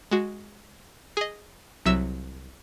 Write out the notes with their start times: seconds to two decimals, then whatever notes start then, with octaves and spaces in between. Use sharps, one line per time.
0.11 G#3 F#4
1.17 G#4 D#5
1.86 C2 F#3 E5 E6 E7